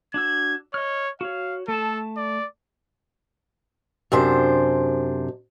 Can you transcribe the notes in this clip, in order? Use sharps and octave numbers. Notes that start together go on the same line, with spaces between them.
D4 F#4 E6 G#6
C#5 D#5 F6
F#4 C#5 F5
A3 A4 A5
D5
F#2 C3 D4 C5